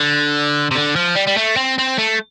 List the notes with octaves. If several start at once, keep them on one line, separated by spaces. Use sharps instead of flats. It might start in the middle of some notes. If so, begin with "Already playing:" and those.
Already playing: D3
C3
D3
F3
G3
G3
A3
C4
C4
A3